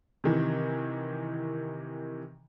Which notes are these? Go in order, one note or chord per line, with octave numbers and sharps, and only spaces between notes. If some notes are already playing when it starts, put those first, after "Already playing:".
C3 D#3 E3